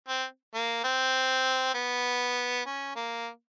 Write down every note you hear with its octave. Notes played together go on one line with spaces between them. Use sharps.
C4
A#3
C4
B3
C#4
A#3